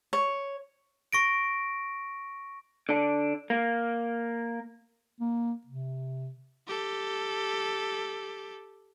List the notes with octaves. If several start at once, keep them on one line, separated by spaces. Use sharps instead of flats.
C#5
C#6 A#6 D7
D3 D4
A#3
A#3
C3
G4 A4